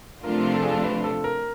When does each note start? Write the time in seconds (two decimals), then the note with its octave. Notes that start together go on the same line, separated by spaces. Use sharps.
0.24 C3 F3 A3 D4 F4 A#4
0.54 A4
0.63 G#4
0.70 A4
0.83 B4
1.04 A4
1.24 A#4